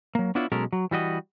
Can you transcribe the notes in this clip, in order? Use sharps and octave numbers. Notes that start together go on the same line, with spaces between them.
F#3 A#3
B3 D4 E4 F4 C#5
B2 F#3 G#3 C#4 A4 A#4
F#3
E3 G3 F#4 D#5